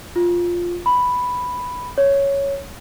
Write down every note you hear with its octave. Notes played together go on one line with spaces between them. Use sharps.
F4
B5
C#5